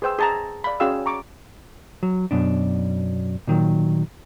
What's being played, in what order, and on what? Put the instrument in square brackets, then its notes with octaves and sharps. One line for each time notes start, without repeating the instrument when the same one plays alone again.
[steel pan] G#4 B4 C5 G5 E6
G#4 A5 A#5
D5 F5 B5
C#4 F#4 G#4 F5 G5 E6
A#5 C#6 D6
[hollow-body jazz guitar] F#3
F#2 B2 D4
A#2 D#3 F#3